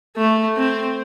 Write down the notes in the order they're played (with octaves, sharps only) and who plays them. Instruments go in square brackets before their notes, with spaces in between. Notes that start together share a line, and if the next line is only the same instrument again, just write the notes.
[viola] A3
C4